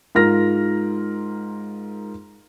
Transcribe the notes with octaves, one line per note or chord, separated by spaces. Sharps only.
G#2 F4 A#4 F6 A#6